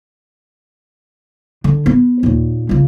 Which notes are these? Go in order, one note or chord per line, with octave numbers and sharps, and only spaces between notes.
D3
B3
D#2 A#2
C#2 C#3